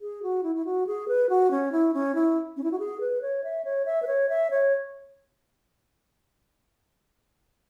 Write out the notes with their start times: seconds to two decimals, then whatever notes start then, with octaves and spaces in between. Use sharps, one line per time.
0.01 G#4
0.23 F#4
0.43 E4
0.55 E4
0.65 F#4
0.87 G#4
1.08 B4
1.29 F#4
1.51 C#4
1.72 E4
1.94 C#4
2.15 E4
2.57 C#4
2.64 E4
2.72 F#4
2.79 G#4
3.01 B4
3.22 C#5
3.44 E5
3.65 C#5
3.85 E5
4.02 B4
4.07 C#5
4.29 E5
4.50 C#5